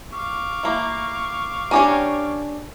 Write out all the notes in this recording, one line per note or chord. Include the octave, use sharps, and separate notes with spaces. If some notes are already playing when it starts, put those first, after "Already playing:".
F5 C#6 D6
A#3 E4
C#4 D4 G4 A#4 G#5